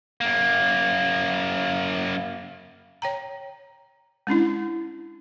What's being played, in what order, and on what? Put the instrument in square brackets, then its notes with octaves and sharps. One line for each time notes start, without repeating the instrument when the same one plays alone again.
[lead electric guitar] F#2 A#3
[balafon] C#5 G5 A#5
G#3 C#4 D4 E4